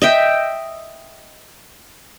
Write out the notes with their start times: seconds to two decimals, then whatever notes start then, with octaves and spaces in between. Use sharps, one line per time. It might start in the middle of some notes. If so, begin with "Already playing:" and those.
0.02 D#5 E5 G5